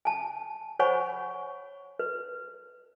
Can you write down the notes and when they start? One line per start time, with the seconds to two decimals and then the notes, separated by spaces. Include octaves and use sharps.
0.05 G#5 A5
0.79 C5 C#5 F#5 G#5 B5 C#6
1.99 B4